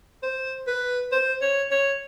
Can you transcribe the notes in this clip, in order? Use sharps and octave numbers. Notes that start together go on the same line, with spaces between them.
C5
B4
C5
C#5
C#5